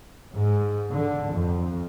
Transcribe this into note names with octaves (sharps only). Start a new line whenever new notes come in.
G#2
D3
F2